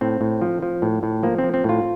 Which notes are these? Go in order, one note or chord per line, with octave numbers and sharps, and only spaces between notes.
A2 C4
A2
F3
F3
A2
A2
F3 A#3
C4
F3
C4
A2 F4